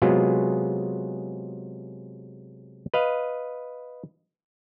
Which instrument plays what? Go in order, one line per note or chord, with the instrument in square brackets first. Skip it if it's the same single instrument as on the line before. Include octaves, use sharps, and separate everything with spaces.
[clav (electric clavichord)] C3 F#3 G#3 B3 F4 G#4
B4 D#5 F5